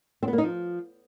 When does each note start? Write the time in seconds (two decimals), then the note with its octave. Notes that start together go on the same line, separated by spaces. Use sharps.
0.23 C4
0.28 B3
0.33 A#3
0.38 D#4
0.43 F3